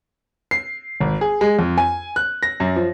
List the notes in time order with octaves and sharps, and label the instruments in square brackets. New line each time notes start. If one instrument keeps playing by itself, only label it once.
[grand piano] C7
G#1
G#4
G#3
F2
G#5
F#6
A#6
F#2
F3